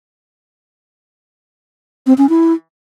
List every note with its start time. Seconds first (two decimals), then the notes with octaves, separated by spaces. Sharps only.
2.07 C4
2.18 C#4
2.29 E4